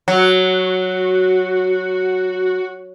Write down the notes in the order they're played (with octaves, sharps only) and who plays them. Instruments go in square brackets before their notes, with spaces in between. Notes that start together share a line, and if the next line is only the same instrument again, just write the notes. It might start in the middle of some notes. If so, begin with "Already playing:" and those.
[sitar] F#3 [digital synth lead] F#4